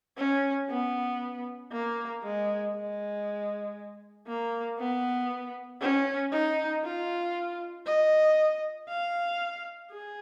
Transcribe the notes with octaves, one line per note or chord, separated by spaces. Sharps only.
C#4
B3
A#3
G#3
G#3
A#3
B3
C#4
D#4
F4
D#5
F5
G#4